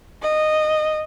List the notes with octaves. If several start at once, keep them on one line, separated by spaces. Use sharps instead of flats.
D#5